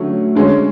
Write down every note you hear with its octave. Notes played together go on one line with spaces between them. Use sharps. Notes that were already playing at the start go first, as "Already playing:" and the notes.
Already playing: D3 F#3 A3 C#4
D3 G#3 C#4